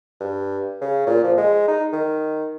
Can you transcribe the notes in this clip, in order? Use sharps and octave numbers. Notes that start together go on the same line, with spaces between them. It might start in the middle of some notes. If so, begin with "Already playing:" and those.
G2
C#3
A#2
F3
G#3
D#4
D#3